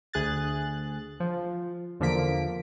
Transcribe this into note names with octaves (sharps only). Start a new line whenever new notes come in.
D2 G#4 F#6 A6
F3
E2 D3 F3 A#3 B6 D7